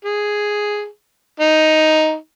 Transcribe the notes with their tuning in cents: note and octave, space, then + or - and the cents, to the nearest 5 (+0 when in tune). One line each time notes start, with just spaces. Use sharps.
G#4 +0
D#4 +5